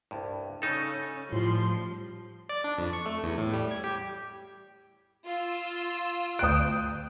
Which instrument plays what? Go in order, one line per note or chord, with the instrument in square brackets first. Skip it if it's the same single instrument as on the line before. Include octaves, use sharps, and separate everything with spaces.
[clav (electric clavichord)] C2 G2
[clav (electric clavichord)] C#3 D#4 A4 [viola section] C#4
[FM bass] A2 [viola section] F3 G3 C6
[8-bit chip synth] D5
D4
F2
C#6
A3
E2
A2
G3
G#6
G4
[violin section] F4 E6
[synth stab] D2 G5 D7 [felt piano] D#6 F#6